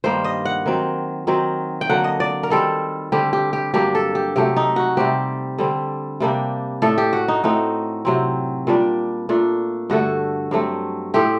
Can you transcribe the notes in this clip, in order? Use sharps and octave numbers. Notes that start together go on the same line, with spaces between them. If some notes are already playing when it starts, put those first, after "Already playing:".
G2 D#3 G3 A#3 C5
D#5
F#5
D#3 F#3 C4
D#3 F#3 C4
G5
D3 F#3 A#3 F#5
D#5
D5
A#4
D#3 G3 C4 A4
D3 G3 C4 G4
G4
G4
G2 F#3 A#3 D4 G4
A4
G4
C3 F#3 A3 G4
D#4
F#4
C3 G3 C4 G4
D3 G3 C4
C3 G3 A#3 D4
A2 A3 D4 A4
G4
F#4
D#4
A2 A3 C4 D#4
C3 F#3 C4
A#2 G3 D4
A#2 A3 D4
G2 D3 A3 F#4
G2 F#3 A3 C4
A2 A3 C4 G4